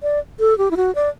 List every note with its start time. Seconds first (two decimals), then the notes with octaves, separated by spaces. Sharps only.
0.03 D5
0.40 A4
0.58 G4
0.71 E4
0.77 F#4
0.95 D5